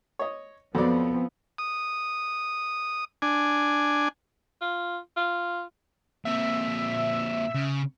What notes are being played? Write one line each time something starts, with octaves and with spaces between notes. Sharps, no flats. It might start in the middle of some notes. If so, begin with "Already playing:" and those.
C#5 D#5
F2 F3 F#3 B3 C4 D5
D#6
D4 G#5
F4
F4
A#2 C4 E5
C#3